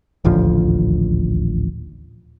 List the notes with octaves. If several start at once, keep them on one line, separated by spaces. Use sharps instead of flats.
D#1 A1 D2 F3